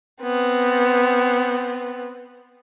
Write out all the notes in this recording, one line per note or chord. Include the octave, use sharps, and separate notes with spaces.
B3 C4